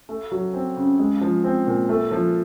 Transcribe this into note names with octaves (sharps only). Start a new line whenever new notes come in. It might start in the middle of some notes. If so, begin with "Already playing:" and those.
A3
F#3
C4
C#3
G#3
F3
C4
A#2
A3
F3